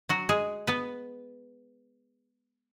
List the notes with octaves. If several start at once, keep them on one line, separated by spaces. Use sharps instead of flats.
F#3 F#4
G#3 G#4
B3 B4